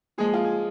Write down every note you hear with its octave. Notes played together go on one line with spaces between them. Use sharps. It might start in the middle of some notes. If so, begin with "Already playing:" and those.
A#2 F3 G#3 G#4
F4
G#4